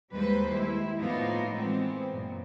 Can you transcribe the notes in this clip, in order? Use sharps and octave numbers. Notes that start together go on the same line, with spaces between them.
D#2 G3 G#3 B4 C5
E4
A2 F3 A#3 B3 D#4 F4
E3 G#3 B3 C4
F#2 A#2